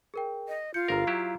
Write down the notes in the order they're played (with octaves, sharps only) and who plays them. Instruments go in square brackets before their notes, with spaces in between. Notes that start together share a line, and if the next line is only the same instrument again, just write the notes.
[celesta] G#4 A#4 G5
[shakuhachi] D#5
[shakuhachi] F4 [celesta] G6 C#7
[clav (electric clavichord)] G1 A#4 [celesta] F5 A#5
[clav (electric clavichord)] F#3 E4 G4